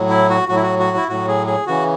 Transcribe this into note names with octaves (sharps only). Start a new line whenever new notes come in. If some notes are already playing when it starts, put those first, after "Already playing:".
Already playing: A2 F#3
E4
F#4
A2 F#3 F#4
E4
F#4
F#4
E4
A2 F#3 F#4
G#4
G#4
C#3 E3 F#4